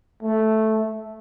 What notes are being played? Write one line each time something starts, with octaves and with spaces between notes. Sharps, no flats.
A3